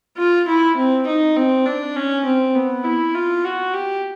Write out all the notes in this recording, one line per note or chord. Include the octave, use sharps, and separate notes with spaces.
F4
E4
C4
D#4
C4
D4
C#4
C4
B3
E4
F4
F#4
G4